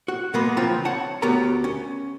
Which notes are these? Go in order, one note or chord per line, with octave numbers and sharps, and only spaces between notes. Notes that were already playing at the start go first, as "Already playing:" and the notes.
F#4
B2 G#3 A#3 B3 B5
C#3 E3 F3 C4 F4 A#5
C#5 F#5 A5
D2 B3 G4 A#4 C#5 A#5
C#4